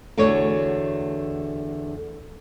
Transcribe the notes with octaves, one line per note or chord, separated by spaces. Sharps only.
E2 D3 A3 F#4 C#5